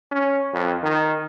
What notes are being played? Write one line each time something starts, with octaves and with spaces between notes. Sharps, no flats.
C#4
F2
D#3